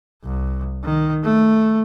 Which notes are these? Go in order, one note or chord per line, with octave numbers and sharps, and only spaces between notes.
C2
D#3
A3